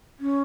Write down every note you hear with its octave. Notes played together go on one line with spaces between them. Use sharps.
C#4